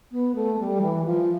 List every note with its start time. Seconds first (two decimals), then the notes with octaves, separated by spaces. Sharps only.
0.12 B3
0.36 A3
0.59 G3
0.82 E3
1.05 F3